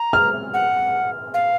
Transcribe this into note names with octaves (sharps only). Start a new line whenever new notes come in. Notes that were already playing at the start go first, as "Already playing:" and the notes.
Already playing: A#5
F6
F#5
F5